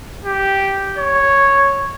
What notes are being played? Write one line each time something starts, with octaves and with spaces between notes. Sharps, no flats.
G4
C#5